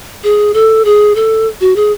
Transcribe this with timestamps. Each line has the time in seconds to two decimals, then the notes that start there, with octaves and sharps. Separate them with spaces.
0.24 G#4
0.54 A4
0.85 G#4
1.15 A4
1.61 F#4
1.76 G#4